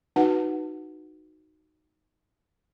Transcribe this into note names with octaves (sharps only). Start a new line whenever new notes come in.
D#4 F#4 B4 F#5